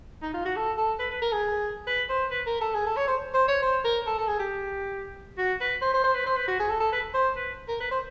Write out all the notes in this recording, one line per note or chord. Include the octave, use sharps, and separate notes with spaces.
D#4
F4
F#4
A4
A4
B4
B4
A#4
G#4
B4
C5
B4
A#4
A4
G#4
A4
C#5
C5
C5
C#5
C5
A#4
A4
A4
G#4
G4
F#4
B4
C5
C5
C5
B4
C5
B4
F#4
G#4
A4
A4
B4
C5
B4
A#4
B4
C5